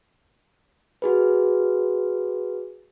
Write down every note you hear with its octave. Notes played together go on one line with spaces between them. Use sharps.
F#4 G#4 B4